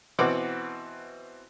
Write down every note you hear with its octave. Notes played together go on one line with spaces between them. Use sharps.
B2 E3 C4 F#5 D6